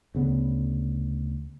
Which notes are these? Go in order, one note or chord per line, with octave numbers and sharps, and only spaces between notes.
D2 C#3 B3